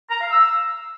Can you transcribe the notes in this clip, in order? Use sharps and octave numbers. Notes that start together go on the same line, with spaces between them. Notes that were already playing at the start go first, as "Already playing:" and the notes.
A#5
F5
E6